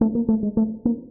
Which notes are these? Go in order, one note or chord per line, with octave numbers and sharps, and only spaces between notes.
A3
A#3
A3
G#3
A3
A#3